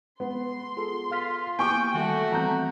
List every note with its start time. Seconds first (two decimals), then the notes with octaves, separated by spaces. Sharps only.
0.20 G#3 B3 C6
0.77 F4 G#4 A4
1.12 F4 F5 F6 B6
1.59 A#3 E4 G4 G5 G#5 C#6 D6
1.94 D#3 G3 A3 F#4
2.32 E3 G3 C4 A#5 G6